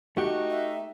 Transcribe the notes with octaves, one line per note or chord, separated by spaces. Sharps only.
A3 D#4 F#4 G4
E5